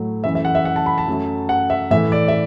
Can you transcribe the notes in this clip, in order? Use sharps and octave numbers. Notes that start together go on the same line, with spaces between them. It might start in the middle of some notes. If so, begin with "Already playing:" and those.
Already playing: A2 F#3 A3
F#2 E3 A3 E5
E5
F#5
E5
F#5
A5
B5
A5
F#2 F#3 A3
F#5
E5
A2 E3 A3 E5
D5
E5